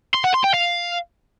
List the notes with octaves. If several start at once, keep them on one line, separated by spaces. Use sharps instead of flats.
C6
F#5
C6
G5
F5